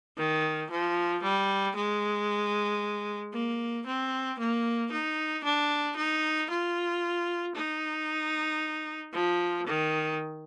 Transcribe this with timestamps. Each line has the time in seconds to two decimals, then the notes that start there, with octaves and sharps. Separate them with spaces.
0.17 D#3
0.70 F3
1.23 G3
1.76 G#3
3.33 A#3
3.86 C4
4.39 A#3
4.92 D#4
5.44 D4
5.97 D#4
6.50 F4
7.55 D#4
9.13 F3
9.67 D#3